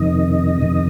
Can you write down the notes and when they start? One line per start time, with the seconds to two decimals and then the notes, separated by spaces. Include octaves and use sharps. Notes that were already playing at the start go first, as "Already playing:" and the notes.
Already playing: F2 C3 D#3 D#5
0.62 F2 C3 D#3